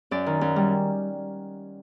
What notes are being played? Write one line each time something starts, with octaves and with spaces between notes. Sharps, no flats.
F#2 D5
D#3
F#2
G3